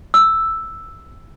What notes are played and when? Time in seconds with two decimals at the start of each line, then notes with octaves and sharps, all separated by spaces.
0.14 E6